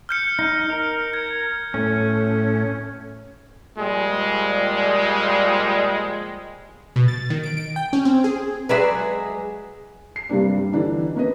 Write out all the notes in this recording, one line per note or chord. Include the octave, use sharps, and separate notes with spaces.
F6 G6 C#7
D#4 F6
A#4
G#6
A2 C#4
A#2 F3 G3 G#3
B2
A6
D#3
D7
D7
G5
C#4
C4
G#4
F#3 G#3 G#4 B4 D5 E5
C7
G2 C3 G3 A#3 D4
G3
D3 E3 D4 D#4
A#3 B3 C#4 B4 D#5